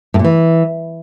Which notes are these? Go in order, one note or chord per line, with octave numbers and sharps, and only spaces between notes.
A2
A#2
E3